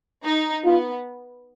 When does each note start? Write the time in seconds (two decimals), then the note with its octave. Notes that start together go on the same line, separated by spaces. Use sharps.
0.24 D#4
0.65 B3 F4